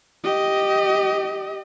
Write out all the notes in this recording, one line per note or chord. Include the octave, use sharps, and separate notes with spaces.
G4 D#5